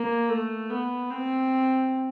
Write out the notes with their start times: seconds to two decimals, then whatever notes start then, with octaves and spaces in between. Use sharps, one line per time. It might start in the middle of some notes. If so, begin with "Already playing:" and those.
Already playing: A#3
0.29 A3
0.70 B3
1.10 C4